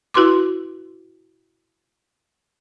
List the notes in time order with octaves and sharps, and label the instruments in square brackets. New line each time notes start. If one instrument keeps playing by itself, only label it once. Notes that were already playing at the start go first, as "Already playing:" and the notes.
[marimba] E4 F#4 B4 C6 D6